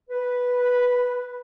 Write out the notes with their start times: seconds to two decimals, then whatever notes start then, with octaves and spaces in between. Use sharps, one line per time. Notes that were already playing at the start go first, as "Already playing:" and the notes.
0.10 B4